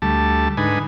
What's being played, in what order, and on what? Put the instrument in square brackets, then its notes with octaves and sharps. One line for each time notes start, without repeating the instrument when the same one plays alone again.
[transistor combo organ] D2 G3 A3 A5
G#2 D3 D#4 B4 G#5